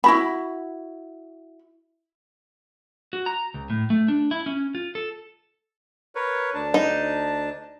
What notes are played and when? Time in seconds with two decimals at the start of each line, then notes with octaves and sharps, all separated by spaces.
0.04 E4 F#4 B5
3.13 F#4
3.26 A#5
3.54 C#2
3.70 A2
3.90 A3
4.08 D4
4.31 E4
4.46 C#4
4.75 F4
4.95 A4
6.15 A#4 B4 C#5
6.54 D2 D4 A5
6.74 D#4